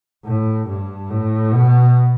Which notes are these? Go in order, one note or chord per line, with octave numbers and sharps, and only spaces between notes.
A2
G2
A2
B2